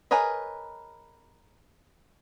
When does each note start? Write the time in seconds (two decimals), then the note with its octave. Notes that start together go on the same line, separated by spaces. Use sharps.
0.11 G#4 A#4 B4 C#5 D#5